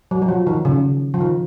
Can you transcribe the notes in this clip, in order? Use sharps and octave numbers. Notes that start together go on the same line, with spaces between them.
F#3
F#3
F3
D#3
C#3
F3
D#3